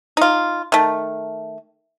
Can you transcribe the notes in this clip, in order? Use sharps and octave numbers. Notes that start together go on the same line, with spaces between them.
D#4 F4
D#3 A3